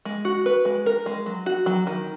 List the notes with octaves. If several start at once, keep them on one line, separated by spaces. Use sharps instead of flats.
G#3
F#4
B4
G#3
A#4
G#3
F#3
F#4
F#3
D#3